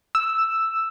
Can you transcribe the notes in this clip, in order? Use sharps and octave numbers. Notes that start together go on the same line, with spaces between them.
E6